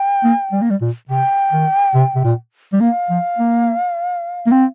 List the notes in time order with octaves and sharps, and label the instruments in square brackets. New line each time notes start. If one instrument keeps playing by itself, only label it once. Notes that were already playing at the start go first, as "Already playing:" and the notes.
Already playing: [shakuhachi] G5
[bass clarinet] A#3
G3
A#3
G3
A#2
[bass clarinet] C3 [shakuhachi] G5
[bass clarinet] D#3
C3
C3
A#2
G3
[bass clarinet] A#3 [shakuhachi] F5
[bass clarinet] F3
A#3
A#3
C4